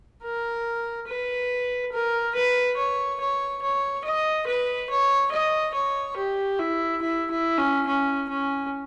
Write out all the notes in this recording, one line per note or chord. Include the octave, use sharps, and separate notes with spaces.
A#4
B4
A#4
B4
C#5
C#5
C#5
D#5
B4
C#5
D#5
C#5
G4
E4
E4
E4
C#4
C#4
C#4